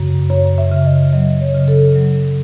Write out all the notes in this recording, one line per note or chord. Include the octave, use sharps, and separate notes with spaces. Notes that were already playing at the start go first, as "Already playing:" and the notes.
Already playing: F#2 C#3
F#2 C#5
E5
C#3
D#5
F#3 D#5
C#5
C#3
A4
F#3